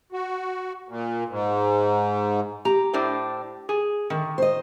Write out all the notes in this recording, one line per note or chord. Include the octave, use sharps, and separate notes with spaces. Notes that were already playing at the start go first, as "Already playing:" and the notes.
F#4
A#2
G#2
G4 A#5
A2 D4 C5
G#4
D3 D#3
C5 D#5